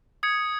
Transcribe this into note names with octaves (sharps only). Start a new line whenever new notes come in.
D#6 G#6 C#7